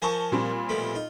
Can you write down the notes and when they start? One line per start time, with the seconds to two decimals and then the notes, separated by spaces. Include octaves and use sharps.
0.02 F3 A#4 C5 G#5 A5 C#6
0.32 A#2 G3 C4
0.69 B2 F3 A3
0.95 D#4 F4